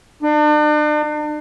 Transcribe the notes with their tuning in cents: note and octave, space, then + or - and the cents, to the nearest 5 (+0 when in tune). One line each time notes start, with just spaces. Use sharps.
D4 +40